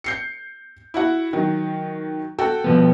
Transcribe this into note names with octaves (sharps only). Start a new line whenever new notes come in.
G6 C7 C#7
E4 F#4 F#5
D#3 F#3
F#4 A4 G5
B2 F3 B3